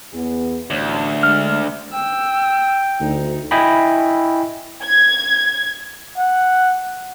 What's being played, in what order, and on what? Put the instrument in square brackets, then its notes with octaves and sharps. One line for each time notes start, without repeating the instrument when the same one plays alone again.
[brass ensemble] E2 B3 G#4
[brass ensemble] A1 C#5 [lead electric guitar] D2
[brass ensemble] D3 G#3 A3 [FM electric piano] F6
[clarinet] G5 [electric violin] E6
[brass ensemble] D2 [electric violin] D#4
[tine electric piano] E4 D#5 G5 G#5 B5
[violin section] G#6
[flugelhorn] F#5